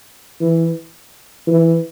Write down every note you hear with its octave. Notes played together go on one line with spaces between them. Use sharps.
E3
E3